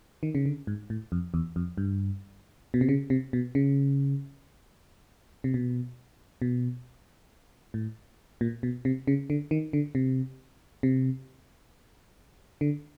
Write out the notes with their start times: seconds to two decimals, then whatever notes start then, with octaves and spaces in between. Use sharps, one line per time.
0.23 D#3
0.35 C#3
0.46 D3
0.67 G#2
0.90 A2
1.12 F2
1.34 E2
1.56 F2
1.78 G2
2.74 B2
2.81 C3
2.89 C#3
3.10 C3
3.33 B2
3.55 C#3
5.44 C3
5.54 B2
6.42 B2
7.74 A2
8.41 A#2
8.63 B2
8.85 C3
9.07 C#3
9.30 D3
9.51 D#3
9.73 D3
9.95 C3
10.83 C3
12.61 D3